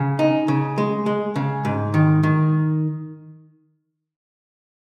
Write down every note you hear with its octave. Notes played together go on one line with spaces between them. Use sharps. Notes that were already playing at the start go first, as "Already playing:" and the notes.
Already playing: C#3
D#4
C#3
G#3
G#3
C#3
G#2
D#3
D#3